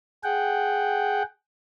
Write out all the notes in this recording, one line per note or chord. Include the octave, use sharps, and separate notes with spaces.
G#4 F#5 G5